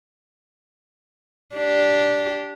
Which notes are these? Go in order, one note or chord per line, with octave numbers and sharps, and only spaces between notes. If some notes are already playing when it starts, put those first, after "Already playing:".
D4 G4